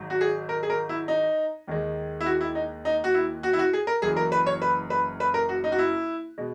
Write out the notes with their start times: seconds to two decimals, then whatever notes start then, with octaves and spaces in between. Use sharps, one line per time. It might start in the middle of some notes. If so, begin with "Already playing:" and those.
Already playing: G#1 G#2 F#3
0.10 F#4
0.21 G#4
0.49 A#4
0.63 G#4
0.70 A#4
0.89 E4
1.08 D#4
1.68 D#2 D#3 G#3
2.21 E4
2.26 F#4
2.41 E4
2.55 D#4
2.85 D#4
3.04 F#4
3.14 E4
3.43 F#4
3.53 E4
3.59 F#4
3.73 G#4
3.87 A#4
4.02 F#1 F#2 E3 G#4
4.16 A#4
4.32 B4
4.47 C#5
4.62 B4
4.90 B4
5.20 B4
5.34 A#4
5.49 F#4
5.64 D#4
5.72 F#4
5.79 E4
6.38 B2 G#3